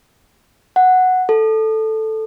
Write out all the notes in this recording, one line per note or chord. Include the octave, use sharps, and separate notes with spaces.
F#5
A4